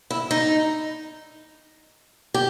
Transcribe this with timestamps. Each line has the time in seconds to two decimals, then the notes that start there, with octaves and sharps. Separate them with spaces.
0.11 E4
0.31 D#4
2.34 G4